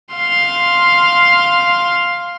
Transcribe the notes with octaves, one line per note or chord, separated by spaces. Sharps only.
F5 C6